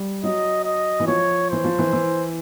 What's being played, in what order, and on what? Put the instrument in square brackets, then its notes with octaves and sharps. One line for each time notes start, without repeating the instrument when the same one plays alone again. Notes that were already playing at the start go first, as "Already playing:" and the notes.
Already playing: [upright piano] G3
[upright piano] F#3 [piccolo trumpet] D#5
[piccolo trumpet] D#5
[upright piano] E3
[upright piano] F3 [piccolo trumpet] C#5
[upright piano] E3 [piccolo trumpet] C5
[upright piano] F3
E3
E3